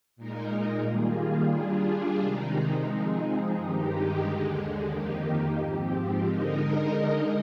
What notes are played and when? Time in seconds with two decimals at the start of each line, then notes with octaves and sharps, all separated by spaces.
0.16 A#2 G#3 D#4 A#4
0.83 D#3 G3 A#3 F4 G#4
1.52 G3 D4 F4 G#4
2.20 C3 D#3 G#3 D#4
2.87 F3 G#3 C4 D#4 G#4
3.55 G2 D#3 G#3 D#4 G4
4.23 D#2 D3 G#3
4.90 F2 D#3 A#3 D#4 G4
5.58 G#2 F3 C4 G4
6.26 D3 G#3 D#4 A#4 D#5